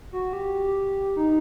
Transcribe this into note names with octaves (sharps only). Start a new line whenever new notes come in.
F#4
G4
D#4